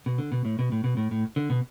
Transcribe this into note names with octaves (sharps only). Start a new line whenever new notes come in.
B2
D3
B2
A2
B2
A2
B2
A2
A2
D3
B2